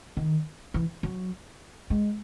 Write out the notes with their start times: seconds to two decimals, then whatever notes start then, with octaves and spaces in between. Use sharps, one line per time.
0.17 D#3
0.74 E3
1.03 F#3
1.90 G#3